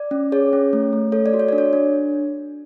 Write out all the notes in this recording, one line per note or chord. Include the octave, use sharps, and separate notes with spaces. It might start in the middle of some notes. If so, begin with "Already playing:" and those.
Already playing: D5
C#4
G#4 C#5
C#4
A3
A3
A4 C#5
D5
F#4
C#5
D4 D5
C#5
D4